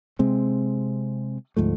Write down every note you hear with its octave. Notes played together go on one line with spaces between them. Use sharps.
C3 G#3 C4
D2 G#2 F3 A3